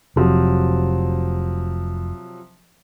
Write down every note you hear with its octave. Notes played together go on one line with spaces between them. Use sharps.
F1 C3 F3 F#3